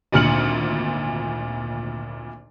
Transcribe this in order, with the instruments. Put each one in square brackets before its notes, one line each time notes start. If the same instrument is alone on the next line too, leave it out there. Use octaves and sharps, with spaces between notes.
[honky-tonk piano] G#1 D2 A#2 F6 C#7 F#7